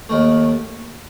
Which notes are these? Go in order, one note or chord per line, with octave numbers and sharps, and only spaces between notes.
D#2 D#3 A3